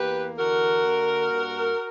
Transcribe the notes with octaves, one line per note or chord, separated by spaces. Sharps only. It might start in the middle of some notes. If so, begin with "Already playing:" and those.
Already playing: E2 A#3 G4 B4
D3 F#4 A#4
A#3
G2